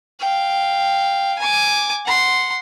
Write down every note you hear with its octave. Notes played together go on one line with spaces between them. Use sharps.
F5 G5
G#5 D6
F#5 C6